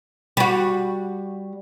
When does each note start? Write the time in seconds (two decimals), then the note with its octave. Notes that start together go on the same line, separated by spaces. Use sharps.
0.37 G3 F#4